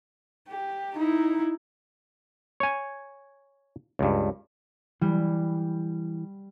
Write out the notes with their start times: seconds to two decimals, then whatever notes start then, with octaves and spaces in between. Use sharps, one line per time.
0.49 G4
0.95 D#4 E4
2.60 C#5 G#5
3.99 C#2 G2
5.02 E3 G3